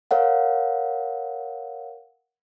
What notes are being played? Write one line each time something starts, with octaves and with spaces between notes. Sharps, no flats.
A#4 C#5 F5 F#5